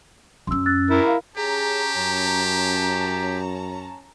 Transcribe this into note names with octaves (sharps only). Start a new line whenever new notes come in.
F#2 C#4 C6 E6
E6 F#6 A6
E4 A#4
F5
C#4 G4 G#4 A5 A#5
F#2